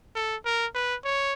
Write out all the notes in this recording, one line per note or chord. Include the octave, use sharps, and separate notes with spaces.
A4
A#4
B4
C#5